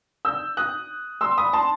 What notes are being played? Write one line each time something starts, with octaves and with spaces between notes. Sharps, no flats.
E6 G6
D#6 F#6
C6 E6
B5 D#6
A5 C6